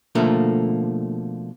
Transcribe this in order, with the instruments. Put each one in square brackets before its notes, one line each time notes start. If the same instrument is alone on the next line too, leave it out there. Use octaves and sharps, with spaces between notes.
[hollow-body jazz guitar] B2 D3 F3 A3 A#3